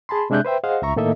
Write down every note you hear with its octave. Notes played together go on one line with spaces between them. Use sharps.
G#4 A5 B5 C6
C3 G#3 D4 E5 F#6 G6
B4 C5 E5 G5
G#4 C5 D#5 F5 F#5
C#2 E5 A#5 C#6
A2 D#3 A#3 A4 D#5 E5